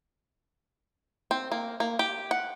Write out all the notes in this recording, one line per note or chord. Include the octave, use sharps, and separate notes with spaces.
C4
A#3
A#3
G4
F#5